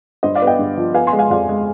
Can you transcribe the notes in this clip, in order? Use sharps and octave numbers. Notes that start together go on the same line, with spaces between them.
G2 C5 D#5
D5 F5
B3
D#5 G5
G2
F3
B3 F5 G#5
G#5 C6
G#3
F5 G#5
F2 D5 F5
G#3